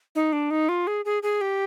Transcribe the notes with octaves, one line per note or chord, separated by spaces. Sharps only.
D#4
D4
D#4
F4
G#4
G#4
G#4
G4